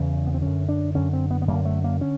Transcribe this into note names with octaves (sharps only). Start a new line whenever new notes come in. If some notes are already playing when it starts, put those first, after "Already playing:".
Already playing: E2 C#3 C#4
B3
C4
F#2 D3 C#4
D4
F#2 D3 C#4
C4
B3
B3
F#2 D3 A#3
A3
A#3
D3 C#4